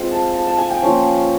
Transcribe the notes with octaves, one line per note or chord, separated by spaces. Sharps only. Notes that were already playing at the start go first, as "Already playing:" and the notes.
Already playing: G#3 C4 F4
A5
A5
A5
G#5
G5
F3 A#3 C#4 F4